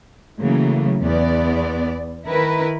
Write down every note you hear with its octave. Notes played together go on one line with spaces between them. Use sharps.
C#3 E3 F#3 A3 A#3
E2 B3 D5
D#3 E4 A#4 B4